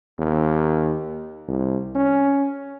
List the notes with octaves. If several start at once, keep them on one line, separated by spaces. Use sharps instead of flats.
D#2
C2
C#4